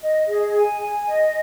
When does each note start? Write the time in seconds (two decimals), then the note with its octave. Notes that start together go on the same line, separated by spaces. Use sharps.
0.01 D#5
0.27 G#4
0.54 G#5
0.80 G#5
1.07 D#5